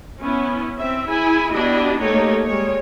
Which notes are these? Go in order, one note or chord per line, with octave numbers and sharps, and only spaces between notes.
B3 C#4 E4
C4 E5
E4 G#4 G#5
B3 D4 E4 F#4 G4 D#5
A3 A#3 D#4 G4 C#5
G3 G#3 C#5